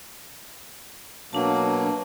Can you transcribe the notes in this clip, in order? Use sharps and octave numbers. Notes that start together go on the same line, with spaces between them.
B2 F#3 A#3 D4 A5